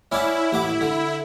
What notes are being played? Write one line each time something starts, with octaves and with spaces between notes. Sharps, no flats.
C#4 E4 D5 F#5
A1 F#5 D6
D3